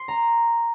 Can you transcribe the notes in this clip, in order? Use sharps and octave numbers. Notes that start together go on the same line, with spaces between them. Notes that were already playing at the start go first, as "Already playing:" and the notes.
Already playing: C6
A#5